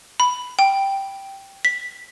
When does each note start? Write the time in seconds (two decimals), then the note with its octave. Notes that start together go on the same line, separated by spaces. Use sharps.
0.20 B5
0.59 G5
1.65 B6